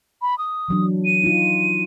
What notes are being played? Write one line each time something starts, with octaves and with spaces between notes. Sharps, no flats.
B5
D#6
E3 F#3 D4
D#7
D#4 F4